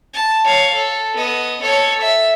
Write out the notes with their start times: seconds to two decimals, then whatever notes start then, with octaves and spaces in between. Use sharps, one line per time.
0.14 A5
0.44 C#5 F5
0.75 A4
1.16 B3 D#5
1.61 A4 C#5
2.01 E5